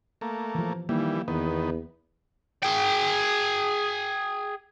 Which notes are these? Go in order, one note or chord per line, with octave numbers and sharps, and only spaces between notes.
A3 A#3
E3 F3
D#3 E3 G3 A#3
E2 D#3 B3 B4
G#4 G5